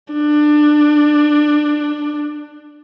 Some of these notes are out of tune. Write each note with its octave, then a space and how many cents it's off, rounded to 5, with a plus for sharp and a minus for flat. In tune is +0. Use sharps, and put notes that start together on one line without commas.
D4 +20